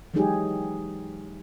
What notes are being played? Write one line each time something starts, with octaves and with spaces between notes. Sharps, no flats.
E3 F#3 G#3 D#4 G4 G#4